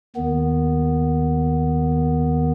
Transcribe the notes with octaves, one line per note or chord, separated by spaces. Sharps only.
D#2 D#3 B3